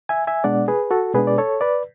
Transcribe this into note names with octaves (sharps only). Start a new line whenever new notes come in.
E5 G#5
E5 G#5
B2 G#3 B3 D4 D5 F#5
G#4 B4
F#4 A4
B2 G#3 B3 D4 G#4 B4
D5
A4 C#5
B4 D5